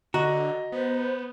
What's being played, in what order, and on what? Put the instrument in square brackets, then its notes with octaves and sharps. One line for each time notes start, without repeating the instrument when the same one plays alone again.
[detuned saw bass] D3 [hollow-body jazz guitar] F#4 [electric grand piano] D#5 A#5
[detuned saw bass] B3 [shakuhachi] C5